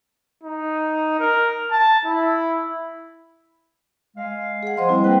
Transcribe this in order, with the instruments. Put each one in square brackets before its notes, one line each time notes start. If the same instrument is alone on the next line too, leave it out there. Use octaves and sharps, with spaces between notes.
[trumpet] D#4
A#4
A5
E4
[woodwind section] G#3 F5
[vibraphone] G#4 F#5
[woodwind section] F3 G#3 [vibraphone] C5 D#5 C6
[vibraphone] G3 C4 E4
[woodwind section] A#3 B4 [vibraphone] G5